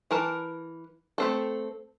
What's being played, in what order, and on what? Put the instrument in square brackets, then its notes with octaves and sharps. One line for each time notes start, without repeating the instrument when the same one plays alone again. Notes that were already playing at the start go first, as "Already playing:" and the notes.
[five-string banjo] E3 A#4 A5
A3 C4 A4